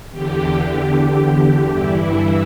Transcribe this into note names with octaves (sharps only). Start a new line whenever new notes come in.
E2 D3 G4
G2 E3 E4